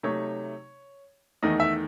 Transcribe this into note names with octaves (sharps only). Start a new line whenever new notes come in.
C3 F#3 A3 D#4 C#5
E2 D#3 A3 D#4 D#5
E5